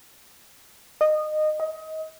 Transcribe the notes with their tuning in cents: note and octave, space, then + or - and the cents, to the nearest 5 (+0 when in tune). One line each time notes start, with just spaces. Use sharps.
D#5 -20
D#5 +25